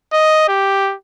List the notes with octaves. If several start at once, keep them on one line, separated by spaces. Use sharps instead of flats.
D#5
G4